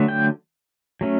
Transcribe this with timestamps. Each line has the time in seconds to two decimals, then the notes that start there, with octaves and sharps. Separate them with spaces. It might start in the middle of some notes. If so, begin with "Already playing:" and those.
Already playing: D3 F#3 A3
0.08 G5
1.01 F#3 A3 C#4